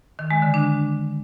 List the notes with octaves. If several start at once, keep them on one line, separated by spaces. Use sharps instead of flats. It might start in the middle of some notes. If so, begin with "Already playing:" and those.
D#3
G#3
D3
D4